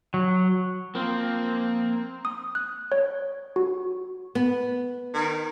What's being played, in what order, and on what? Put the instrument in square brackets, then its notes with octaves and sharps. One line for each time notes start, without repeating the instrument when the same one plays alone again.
[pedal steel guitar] F#3
[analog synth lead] F3 [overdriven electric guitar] A#3 [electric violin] C4
[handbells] D#6
F#6
C#5
F#4
[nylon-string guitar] B3
[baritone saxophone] D#3